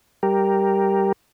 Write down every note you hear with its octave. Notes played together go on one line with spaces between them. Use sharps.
G3 G4 A#4